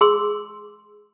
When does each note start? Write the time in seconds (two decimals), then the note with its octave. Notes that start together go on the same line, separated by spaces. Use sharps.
0.01 G#4 C6 E6